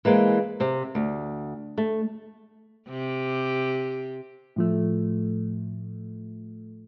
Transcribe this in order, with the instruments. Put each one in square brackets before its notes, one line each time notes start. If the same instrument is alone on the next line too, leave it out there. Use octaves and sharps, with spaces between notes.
[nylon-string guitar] E3 G#3 A#3 C4
C3 C4
D2
A3
[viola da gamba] C3 G4
[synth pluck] A2 F3 A3